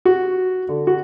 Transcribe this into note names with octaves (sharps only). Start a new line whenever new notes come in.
F#4
D3
F#4